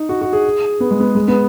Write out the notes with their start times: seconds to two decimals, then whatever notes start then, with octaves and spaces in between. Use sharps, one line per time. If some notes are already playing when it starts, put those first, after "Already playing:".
Already playing: D#4
0.09 F#4
0.21 F#4
0.33 G#4
0.80 B3
0.91 G#3
1.00 B3
1.15 G#3
1.28 B3